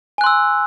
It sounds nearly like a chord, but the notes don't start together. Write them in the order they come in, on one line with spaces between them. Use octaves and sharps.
G#5 F#6 C6 E6